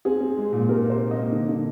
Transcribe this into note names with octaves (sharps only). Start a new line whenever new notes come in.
C4 G#4
C4
G#3
A#2
C3 A#4
A#3
C5
C3
D#5
A#3
D3
D3